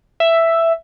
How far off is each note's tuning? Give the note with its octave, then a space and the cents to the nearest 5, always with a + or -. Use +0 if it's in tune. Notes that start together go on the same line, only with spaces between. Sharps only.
E5 +5